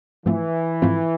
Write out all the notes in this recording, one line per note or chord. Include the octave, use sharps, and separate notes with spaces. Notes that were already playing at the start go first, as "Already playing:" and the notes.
G#2 E3 F3 A3 C4 F4
G#2 F3 A3 C4 F4